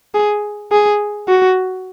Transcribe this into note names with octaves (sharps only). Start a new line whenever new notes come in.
G#4
G#4
F#4